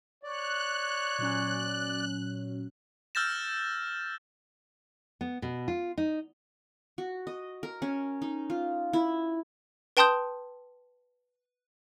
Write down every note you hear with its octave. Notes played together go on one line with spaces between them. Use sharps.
C#5 D5 F#6
A#2 F#3 C#4
E6 F6 G6 A6 A#6 E7
B3
B2
F4
D#4
F#4
D#5
A#4
C#4
D#4
F4
E4
B4 G5 A5 C6 D#6 G6